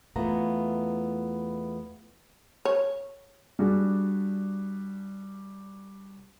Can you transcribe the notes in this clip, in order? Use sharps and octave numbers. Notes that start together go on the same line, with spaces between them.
E2 A3 B3 E4 F4 A#5
C#5
G3 D4 F#4 G#4